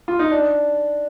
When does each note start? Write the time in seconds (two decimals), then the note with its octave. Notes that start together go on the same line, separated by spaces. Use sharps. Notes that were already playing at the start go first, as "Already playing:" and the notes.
0.08 F4
0.19 D#4
0.31 D4